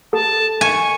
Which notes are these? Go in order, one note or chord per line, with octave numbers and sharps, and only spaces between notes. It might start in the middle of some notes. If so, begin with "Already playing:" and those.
A4 A5
G#5 C#6